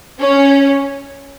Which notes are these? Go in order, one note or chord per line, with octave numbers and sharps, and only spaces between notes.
C#4